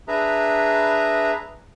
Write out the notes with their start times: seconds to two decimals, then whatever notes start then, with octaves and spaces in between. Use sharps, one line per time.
0.08 D4 G#4 B4 E5 A#5